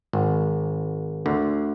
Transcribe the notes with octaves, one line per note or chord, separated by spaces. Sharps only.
G#1 G#2
D2 D3